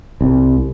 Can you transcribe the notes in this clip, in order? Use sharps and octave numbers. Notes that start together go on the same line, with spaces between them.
C2